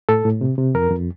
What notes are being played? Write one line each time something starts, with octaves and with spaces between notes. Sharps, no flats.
A2 A4
A2
C3
C3
F2 A#4
F2